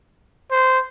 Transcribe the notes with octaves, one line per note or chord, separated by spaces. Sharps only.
C5